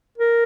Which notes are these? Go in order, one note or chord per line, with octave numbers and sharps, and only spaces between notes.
A#4